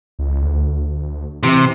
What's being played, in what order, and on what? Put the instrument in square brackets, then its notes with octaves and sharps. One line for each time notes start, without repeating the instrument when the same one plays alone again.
[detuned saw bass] C#2
D2
[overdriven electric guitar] C3 [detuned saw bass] E3